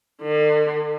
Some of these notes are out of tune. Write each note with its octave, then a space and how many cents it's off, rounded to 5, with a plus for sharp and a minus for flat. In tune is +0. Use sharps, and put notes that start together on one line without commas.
D3 +45